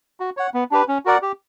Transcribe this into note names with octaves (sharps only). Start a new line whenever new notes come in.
F#4
C#5 F#5
B3
D4 G4 B4
C#4
F#4 A#4 D5 F#5
G4